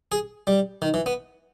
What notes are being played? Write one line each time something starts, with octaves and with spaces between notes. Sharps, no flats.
G#4
G3
D#3
E3
B3